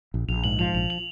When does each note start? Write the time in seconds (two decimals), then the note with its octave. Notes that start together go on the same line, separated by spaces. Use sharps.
0.14 A#1
0.28 A#1 F7
0.44 G#2 F#7
0.59 F3 F7
0.74 A#1 F7
0.90 F#7